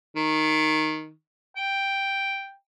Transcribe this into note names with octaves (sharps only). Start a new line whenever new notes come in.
D#3
G5